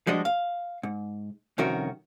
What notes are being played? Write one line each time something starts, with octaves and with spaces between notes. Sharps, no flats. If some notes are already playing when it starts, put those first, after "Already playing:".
F3 G3 G#3 D4 F#4 D#5
F5
G#2
C2 F2 D#3 C#4 F#4 A#4